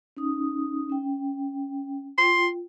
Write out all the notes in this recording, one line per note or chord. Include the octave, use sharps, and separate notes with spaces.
C#4 D#4 D#6
C#4 G5
F4 G5 C6